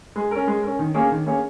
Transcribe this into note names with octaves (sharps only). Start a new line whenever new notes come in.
G#3
C#4 A#4
G#3
C#4 A#4
D#3
A#3 C#4 G#4 C#5
D#3
A#3 C#4 G#4 C#5